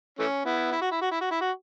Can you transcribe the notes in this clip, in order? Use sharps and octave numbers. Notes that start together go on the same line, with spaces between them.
E3 A3 C#4
B3 E4
E4
F#4
E4
F#4
E4
F#4
E4
F#4